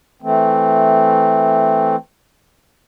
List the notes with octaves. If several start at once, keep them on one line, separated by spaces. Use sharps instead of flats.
E3 A3 C4